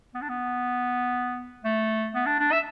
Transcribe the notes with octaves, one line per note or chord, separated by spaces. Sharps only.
B3
D4
B3
A3
B3
D4
D4
E5